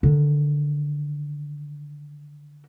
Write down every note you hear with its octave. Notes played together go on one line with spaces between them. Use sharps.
D3 D#3